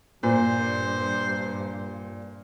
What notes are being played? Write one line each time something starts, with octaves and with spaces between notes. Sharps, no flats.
G2 A#2 C5